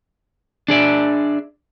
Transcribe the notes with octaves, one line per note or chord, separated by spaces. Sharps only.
D4 G#4 D5 E5